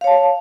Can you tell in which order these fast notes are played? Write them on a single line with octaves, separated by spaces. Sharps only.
F5 C#5 A5